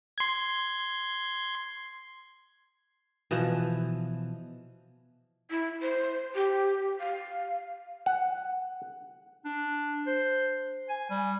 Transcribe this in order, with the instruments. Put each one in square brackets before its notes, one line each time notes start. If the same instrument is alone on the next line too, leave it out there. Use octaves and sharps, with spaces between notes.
[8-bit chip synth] C6 G#6
[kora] B2 E3 F3
[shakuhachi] E4
C5
G4
F5
[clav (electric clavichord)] F#5
[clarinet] D4
C5
G#5
G3